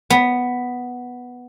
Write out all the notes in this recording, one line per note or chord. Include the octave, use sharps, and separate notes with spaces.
B3